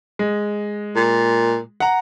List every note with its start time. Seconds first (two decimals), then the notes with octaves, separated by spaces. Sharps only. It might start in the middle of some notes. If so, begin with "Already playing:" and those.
0.19 G#3
0.95 A#2
1.80 F#5 A#5